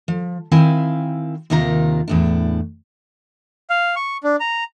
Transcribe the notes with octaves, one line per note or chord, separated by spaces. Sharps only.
F3
D#3 C4 E4 F5 G#5
D#2 C3 D#3 F4 A#4 A#5
E2 A2 D4
F5
C#6
D4
A#5